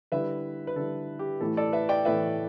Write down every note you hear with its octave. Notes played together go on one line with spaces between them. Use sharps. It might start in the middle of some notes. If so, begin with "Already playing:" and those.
D3 G3 E4 B4 E5
B4
D3 G3 E4 A4
G4
A2 E3 A3 E4 A4
A4 D5
B4 E5
D5 G5
A2 E3 A3 E4 B4 E5